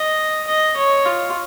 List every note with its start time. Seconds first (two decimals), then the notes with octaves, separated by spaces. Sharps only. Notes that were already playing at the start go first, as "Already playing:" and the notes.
Already playing: D#5
0.47 D#5
0.77 C#5
1.05 F4